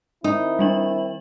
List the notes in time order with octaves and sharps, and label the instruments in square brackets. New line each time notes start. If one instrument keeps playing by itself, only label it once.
[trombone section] D#3 C4 E4 [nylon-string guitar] D#4
[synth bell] G3 D4 F#7